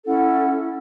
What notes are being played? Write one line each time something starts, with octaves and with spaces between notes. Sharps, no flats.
C#4 E4 A4 F#5